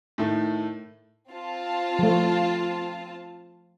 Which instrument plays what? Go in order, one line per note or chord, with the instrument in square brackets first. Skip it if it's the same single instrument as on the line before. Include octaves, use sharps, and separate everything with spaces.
[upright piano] A2 D#3 A3
[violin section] C4 F4 A5
[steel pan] F3 A3